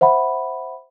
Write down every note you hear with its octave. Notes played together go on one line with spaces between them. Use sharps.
C5 E5 F#5 B5